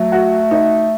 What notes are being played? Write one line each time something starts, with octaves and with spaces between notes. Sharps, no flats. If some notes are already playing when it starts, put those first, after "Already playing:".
Already playing: F#3 A3
F#4
D#4